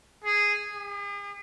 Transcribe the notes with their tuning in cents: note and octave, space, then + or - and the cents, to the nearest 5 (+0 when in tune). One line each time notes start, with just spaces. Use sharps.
G#4 -5
G#4 -45